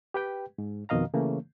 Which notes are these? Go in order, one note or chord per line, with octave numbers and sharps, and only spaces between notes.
G4 B4 G5
G#2
F2 B2 D#3 D#5 F5 A#5
C#3 E3 A3 A#3